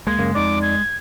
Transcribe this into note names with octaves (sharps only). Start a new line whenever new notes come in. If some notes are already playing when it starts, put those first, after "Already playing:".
D2 G#3 A#3 G#6
F#2 C#3 A#3
F2 D#4 D5 D6
G#6